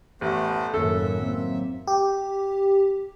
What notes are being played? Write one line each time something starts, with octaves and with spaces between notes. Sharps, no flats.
A1 A3 B3 C5
F#2 A2 D#3 A#3 A4 E5
F#3 A#3 C4
G4